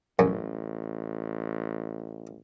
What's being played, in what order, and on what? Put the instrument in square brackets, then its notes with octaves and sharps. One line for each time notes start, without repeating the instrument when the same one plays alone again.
[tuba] A1 [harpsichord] F#2